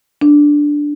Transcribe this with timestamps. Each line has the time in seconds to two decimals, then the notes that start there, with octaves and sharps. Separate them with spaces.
0.21 D4